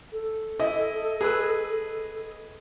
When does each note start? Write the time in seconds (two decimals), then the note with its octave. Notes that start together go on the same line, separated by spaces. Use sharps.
0.13 A4
0.60 E4 D#5
1.21 G#4 B4 E6